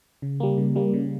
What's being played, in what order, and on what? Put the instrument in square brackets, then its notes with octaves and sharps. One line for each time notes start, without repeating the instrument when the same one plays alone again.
[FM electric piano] C#3
G3 A#3
C#3
G3 A#3
C#3